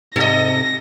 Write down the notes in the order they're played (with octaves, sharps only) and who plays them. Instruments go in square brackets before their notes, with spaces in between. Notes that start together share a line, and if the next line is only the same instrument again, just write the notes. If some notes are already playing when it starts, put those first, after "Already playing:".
[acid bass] G#2 [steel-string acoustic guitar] C3 [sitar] A4 D#5 [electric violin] A#6